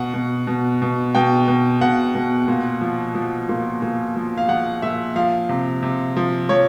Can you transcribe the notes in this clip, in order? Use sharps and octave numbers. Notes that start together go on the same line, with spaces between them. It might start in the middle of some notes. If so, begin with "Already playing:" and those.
Already playing: B2 F#5
B2
B2
B2
B2 G5
B2
B2 F#5
B2
A#2
F3
F3
A#2
A#2
F3
F5
F3 F#5
A#2 E5
F3 F5
C3
C3
F3
F3 C#5